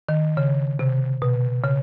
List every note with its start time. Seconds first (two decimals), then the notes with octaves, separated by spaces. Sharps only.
0.09 D#3
0.37 C#3
0.79 C3
1.22 B2
1.64 C#3